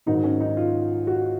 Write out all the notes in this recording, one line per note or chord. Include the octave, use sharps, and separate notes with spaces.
G#2 D#3 F#3 D#4
C#4
D#4
F4
F#4